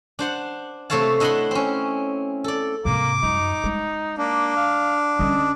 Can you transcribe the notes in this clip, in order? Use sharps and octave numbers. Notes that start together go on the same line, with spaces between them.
D4 C5 F#5
C3 A3 A4 C#5 F5 A5
D4 E4 D#5 F#5 B5 C6
C4 C#4
A4 D5
G#2 C3 A#3 D6
F#2 D#4
G#3
A#3 D4
F5
D3 C#4 D#5